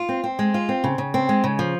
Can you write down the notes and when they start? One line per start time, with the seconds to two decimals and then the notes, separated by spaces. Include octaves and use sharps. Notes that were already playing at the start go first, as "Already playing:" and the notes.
Already playing: F4
0.09 C4
0.24 C4
0.39 G#3
0.54 F4
0.69 C4
0.84 C#3
0.98 C#3
1.14 C4
1.29 G#3
1.44 C#3
1.59 F3